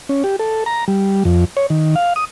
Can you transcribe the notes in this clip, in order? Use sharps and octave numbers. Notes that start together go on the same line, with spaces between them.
C#4
G4
A4
A#5
G3
F2
C#5
D#3
F5
D#6